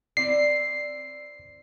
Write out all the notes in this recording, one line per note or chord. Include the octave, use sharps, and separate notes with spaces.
C4 E4 D5 C7